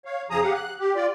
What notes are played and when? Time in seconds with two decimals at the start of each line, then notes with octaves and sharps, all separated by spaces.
0.05 C#5 F5
0.30 F2 C#3 F3 G#4 A#5 D#6
0.43 G4 F5 F#5
0.54 F#6
0.80 G4
0.96 F4 D5